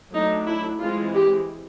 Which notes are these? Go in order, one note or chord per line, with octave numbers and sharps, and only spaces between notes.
F#3 A3 D4 D#4
E4
E3 G#3 C4 F4
G4